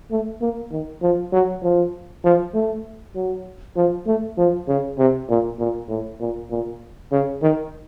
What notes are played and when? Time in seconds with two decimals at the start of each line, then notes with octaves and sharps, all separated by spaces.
0.11 A3
0.41 A#3
0.72 D#3
1.02 F3
1.33 F#3
1.63 F3
2.24 F3
2.54 A3
3.15 F#3
3.76 F3
4.07 A3
4.38 F3
4.68 C#3
4.98 C3
5.29 A#2
5.59 A#2
5.89 A2
6.20 A#2
6.51 A#2
7.12 C#3
7.42 D#3